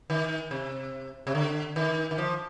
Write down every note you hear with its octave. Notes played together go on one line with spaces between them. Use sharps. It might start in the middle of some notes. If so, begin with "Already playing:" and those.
D#3
C3
C3
D3
D#3
D#3
F3